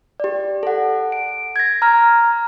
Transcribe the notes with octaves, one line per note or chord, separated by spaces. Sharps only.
G4 D5
A4 F#5
D7
G#6 A#6
A#5 F6 A#6